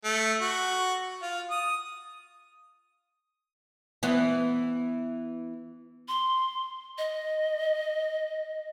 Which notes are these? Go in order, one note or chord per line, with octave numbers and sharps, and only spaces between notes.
A3
F#4
F4
D#6
E3 B3
C6
D#5